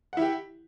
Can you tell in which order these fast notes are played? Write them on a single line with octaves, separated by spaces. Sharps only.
F#5 E4 G4